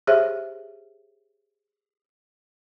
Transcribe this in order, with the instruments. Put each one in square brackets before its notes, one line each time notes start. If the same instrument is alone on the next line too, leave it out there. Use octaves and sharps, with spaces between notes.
[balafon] G4 G#4 C5 C#5 E5